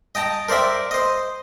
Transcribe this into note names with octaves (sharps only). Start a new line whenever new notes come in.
D#5 G5 A5 A#5
A#4 C5 D5 E5 G5
C5 D#5